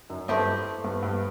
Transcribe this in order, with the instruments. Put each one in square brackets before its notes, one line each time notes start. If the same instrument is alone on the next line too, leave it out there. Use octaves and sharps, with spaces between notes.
[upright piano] F#2
[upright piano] G2 [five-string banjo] A3 C4 E4 G4 D#5
[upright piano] G2
G2